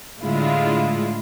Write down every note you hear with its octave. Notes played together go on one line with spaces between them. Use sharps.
A2 D3 G#3 E4 F4